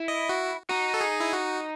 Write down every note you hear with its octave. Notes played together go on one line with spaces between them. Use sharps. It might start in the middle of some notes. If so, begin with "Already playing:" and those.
Already playing: E4
D#5
F#4
D#4 F#4
A4
G#4
E4
F#4